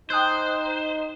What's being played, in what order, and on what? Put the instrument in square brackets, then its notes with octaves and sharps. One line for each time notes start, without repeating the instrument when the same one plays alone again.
[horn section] D#4 [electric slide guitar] C5 [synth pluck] G5 D#6 F#6